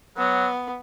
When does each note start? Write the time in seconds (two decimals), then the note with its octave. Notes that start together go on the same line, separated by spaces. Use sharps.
0.17 F#3 B3